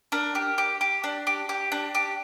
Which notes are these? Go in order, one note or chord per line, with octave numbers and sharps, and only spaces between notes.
D4 A#4
G4
G4
G4
D4
G4
G4
D4
G4